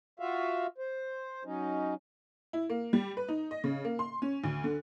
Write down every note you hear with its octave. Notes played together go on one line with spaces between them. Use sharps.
F4 F#4 E5 F5
C5
F#3 C#4 D#4
E4
A#3
G3
B4
D#4
D#5
C#3
A#3
C6
C#4
D2
D3